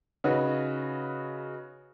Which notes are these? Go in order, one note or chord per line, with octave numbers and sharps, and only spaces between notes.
C#3 D#4 F#4 B4